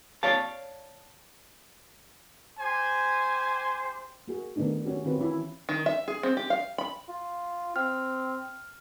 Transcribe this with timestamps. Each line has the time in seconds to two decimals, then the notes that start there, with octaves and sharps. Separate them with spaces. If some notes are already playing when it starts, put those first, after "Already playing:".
0.23 C#5 D5 F5 A5
2.58 G4 C5 G#5
4.28 A#3 F#4 G#4
4.56 D#3 A3 B3 D4 D#4
4.85 C#4 F#4 G4
5.05 D#3 C4 F4 F#4 B4
5.18 E3 C#4 E4
5.69 D#3
5.86 E5
6.08 G#4
6.23 C4
6.37 G4
6.50 F5
6.78 B5
7.09 F4
7.76 C4 F6